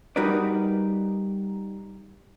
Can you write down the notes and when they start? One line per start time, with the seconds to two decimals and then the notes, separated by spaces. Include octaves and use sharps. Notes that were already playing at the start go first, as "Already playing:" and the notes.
0.16 G3 D#4 F#4 A#4 B4 D5